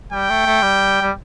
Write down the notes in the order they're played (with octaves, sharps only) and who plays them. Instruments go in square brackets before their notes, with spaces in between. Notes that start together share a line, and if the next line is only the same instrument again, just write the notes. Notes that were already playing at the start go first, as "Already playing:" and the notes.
[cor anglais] G3 [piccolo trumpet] G5
[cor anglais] A3
A3
G3
G3